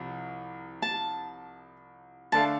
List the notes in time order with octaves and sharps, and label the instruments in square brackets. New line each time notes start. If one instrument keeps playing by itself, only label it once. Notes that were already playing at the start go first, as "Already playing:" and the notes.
Already playing: [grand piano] C2 C3 F3
[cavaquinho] A5
[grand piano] D3 A3 D4 A4 F5 [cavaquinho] A5